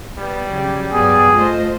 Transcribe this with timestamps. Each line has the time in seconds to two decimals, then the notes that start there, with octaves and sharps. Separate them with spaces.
0.18 G3 B3
0.48 C#3 F#3 G4
0.92 G2 F#3 B3 G#4 D5
1.33 A3 F4 C5 D#5